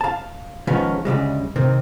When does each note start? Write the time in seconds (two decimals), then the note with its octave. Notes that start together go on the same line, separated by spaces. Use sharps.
0.01 F5 A5
0.67 D#3 F3 G#3 B3 C#4
1.05 D2 C#3 G3 G#3
1.56 C3 D#3 C4